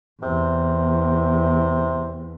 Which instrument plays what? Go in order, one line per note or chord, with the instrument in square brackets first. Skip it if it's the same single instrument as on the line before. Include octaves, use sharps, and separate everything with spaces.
[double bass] E2 [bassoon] C3